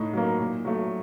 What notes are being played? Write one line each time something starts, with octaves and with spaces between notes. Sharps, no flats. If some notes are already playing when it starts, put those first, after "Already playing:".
Already playing: A2 D#4
F#3 A#3
A#2
F#3 A3